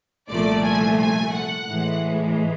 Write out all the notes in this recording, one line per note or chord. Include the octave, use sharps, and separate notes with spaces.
C2 A#2 F3 A3 D5
G#5
G#5
F#5
A2 E3 G#3